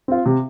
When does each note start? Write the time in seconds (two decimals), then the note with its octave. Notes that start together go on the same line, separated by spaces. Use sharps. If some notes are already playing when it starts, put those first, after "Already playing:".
0.08 C4 F4
0.26 C3